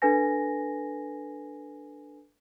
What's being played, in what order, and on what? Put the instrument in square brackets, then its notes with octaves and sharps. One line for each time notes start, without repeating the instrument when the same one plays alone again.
[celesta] D4 A4 B4 G#5 A#6